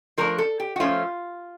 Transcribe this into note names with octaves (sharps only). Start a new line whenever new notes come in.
F3 A3 D4 A#4
A4
G4
F#4
F3 A3 C#4 F4